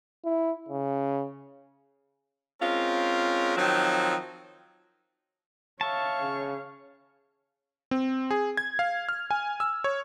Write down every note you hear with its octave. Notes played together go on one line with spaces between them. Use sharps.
E4
C#3
G#3 C4 C#4 F4 A#4
D#3 F3 F#3 C4 D#4
C#5 E5 F5 A5 C#6
C#3
C4
G#4
G#6
F5
F6
G#5
E6
C#5